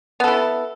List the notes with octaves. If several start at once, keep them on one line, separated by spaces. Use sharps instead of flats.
B3 E4 A4